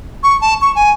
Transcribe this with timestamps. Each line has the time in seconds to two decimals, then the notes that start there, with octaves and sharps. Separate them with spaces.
0.23 C#6
0.41 A5
0.61 C#6
0.75 G#5